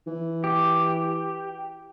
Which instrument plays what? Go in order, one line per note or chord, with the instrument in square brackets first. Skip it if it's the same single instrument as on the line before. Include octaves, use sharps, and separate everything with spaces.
[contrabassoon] E3
[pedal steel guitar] G4